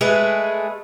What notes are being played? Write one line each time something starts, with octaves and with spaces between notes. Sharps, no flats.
G#3 A3 G#4 B4